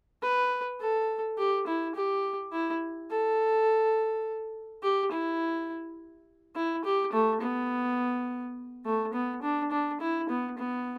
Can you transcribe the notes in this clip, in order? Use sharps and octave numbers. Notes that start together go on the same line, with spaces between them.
B4
A4
G4
E4
G4
E4
A4
G4
E4
E4
G4
A3
B3
A3
B3
D4
D4
E4
B3
B3